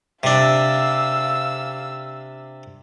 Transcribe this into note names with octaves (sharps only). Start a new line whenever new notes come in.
C3 D4 F5 E6